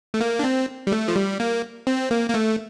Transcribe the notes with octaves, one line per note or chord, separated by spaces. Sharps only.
A3
A#3
D4
C4
G3
A3
F3
G3
A#3
C4
A#3
A#3
A3